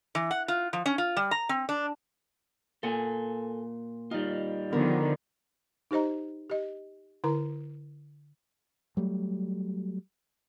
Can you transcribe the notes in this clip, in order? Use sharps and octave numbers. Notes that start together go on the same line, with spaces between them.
E3
F#5
F4
F3
C#4
F4
G3
A#5
C4
D4
A#2 A4 F#5 G#5
G3 D#4 F4
D3 D#3 F3 B3 A#4
D#4 G4 C5 D#5 A#5
G4 D#5
D3 E4 A#4 A#5
F#3 G3 A3